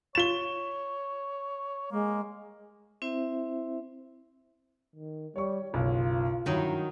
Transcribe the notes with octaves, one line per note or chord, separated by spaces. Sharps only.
F4 C#5 A6 E7 G7
G#3 A#3
C4 E4 C5 E5
D#3
G3 C#5 C#6
F#1 B1 C#3 F4
G2 D#3 F#3 D#4 E4